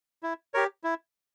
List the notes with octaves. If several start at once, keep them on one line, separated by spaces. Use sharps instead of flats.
E4
G4 A#4 C#5
E4